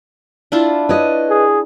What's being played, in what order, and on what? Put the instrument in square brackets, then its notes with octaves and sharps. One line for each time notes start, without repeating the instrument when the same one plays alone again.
[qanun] D4 E4 F4
[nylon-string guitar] B4 C#5 D#5
[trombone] G#4